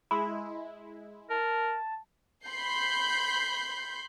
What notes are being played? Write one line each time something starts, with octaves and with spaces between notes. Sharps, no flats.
G#3 E4
A#4 A5
B5 C6 G6 C7